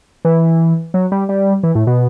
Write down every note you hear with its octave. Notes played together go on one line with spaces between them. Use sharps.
E3
F#3
G3
G3
E3
A2
B2